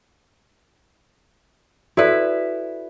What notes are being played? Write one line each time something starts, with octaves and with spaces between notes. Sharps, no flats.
E4 F#4 A4 B4 D5